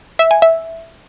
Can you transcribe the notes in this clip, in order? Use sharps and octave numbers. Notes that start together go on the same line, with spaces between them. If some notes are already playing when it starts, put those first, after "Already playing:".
E5
G#5
E5